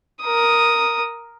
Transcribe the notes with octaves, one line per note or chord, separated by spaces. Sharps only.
A#4 D#6